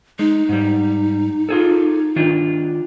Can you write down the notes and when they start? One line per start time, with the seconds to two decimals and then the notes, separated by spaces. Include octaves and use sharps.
0.19 G#3 D#4
0.49 G#2 G3
1.49 F4 G#4 A4
2.16 D#3 D4 F4